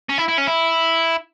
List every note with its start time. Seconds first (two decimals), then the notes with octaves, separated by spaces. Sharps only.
0.10 C#4
0.18 E4
0.29 E4
0.38 C#4
0.47 E4